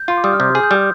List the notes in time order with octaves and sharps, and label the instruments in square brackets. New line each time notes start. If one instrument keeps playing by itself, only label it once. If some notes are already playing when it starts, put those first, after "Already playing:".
Already playing: [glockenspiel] G6
[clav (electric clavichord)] F4 [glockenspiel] C6
[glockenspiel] D6
[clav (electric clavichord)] G3 [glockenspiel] D#6
[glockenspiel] F6
[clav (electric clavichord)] C3 [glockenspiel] G6
[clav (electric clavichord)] G#4
[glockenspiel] G6
[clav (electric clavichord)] G3